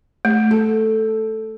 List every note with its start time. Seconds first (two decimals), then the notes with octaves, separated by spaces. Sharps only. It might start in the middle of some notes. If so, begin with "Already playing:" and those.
0.25 A3
0.51 A4